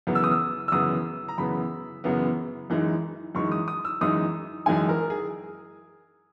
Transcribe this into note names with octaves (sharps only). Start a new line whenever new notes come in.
F#2 C#3 E3 B3
E6
D#6
E6
E6
F#2 C#3 E3 B3 D#6
A#5
F#2 C#3 E3 B3 B5
F#2 C#3 E3 B3
F#2 E3 G#3 D#4
F#2 E3 G#3 D#4 C#6
D#6
D#6
E6
F#2 E3 G#3 D#4 D#6
F#2 E3 G#3 D#4 G#5
A#4
G#4